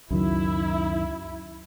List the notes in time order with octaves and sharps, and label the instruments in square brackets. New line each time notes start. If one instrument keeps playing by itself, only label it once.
[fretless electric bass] C#2 F#3 [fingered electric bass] F#2 D#3 [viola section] E4